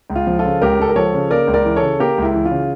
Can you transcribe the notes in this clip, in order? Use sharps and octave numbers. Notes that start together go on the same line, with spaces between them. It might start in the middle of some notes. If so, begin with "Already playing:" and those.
C#2
F4
F3
F4 A4
C#3
C#2 G4 A#4
C#2 A4
A#4
F3 A4 C#5
C#3
A#3 A#4 D5
C#2
A#4 D5
E3
A4 C#5
C#3
A#3 G4 A#4
C#2 E4
E3
F4
C#3